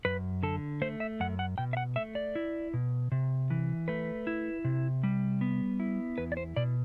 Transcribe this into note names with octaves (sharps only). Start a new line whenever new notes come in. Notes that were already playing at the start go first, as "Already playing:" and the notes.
F#2 B4
D3 A4
A3 C5
E5
F#2 F#5
F#5
B2 G5
E5
F#5
A3 E5
D5
E4
B2
C3
E3
A3 B4
E4
C3
G3
B3
E4
E2 B4
D5
C5
B2 D5